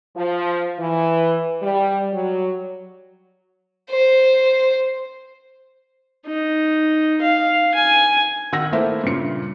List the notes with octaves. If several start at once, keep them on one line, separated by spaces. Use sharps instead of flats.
F3
E3
G3
F#3
C5
D#4
F5
G#5
D#3 F#5 E6 A#6
A3 A#3 E4 C5 E5
G2 A#2 C#3 C#7